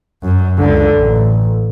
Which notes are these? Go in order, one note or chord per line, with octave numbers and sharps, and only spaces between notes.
F#2
C#2 D3
A1